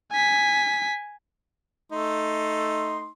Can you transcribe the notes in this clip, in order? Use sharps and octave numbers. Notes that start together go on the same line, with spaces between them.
G#5 B6
A3 D#4 C6